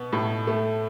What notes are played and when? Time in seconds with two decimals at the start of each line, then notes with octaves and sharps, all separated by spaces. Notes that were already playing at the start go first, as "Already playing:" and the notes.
Already playing: B2 B3
0.13 A2
0.47 A3